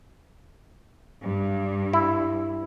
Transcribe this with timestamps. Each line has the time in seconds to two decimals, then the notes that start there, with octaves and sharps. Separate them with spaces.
1.23 G2
1.93 E4